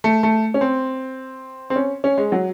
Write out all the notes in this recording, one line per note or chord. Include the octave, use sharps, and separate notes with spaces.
A3
A3
C#4
C4
C4
C#4
C#4
G#3
F#3